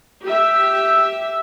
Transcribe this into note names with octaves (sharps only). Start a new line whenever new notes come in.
G4 E5